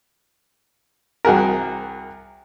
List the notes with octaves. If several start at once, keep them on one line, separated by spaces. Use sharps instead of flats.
C2 F#4 G#4 A#4